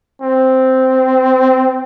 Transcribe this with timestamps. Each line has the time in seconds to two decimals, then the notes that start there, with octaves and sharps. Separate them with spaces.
0.22 C4